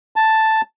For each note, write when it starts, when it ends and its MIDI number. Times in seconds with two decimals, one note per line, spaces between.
0.16 0.61 81